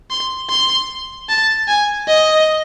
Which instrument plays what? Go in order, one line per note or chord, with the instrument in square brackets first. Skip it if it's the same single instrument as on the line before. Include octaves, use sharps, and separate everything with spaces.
[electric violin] C6
C6
A5
G#5
D#5